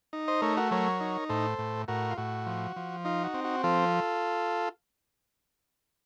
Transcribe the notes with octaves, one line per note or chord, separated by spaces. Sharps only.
D#4
C5 D#5
A3 A#4 C#5
F#4 A#4
F#3 A#4 C#5
D#4
A2 A4 C5
A2
A2 F#4 A#4
F4
A2 F#4
F3
F3
D#4 F4
F#4
C4
F#4
F3 F4 A4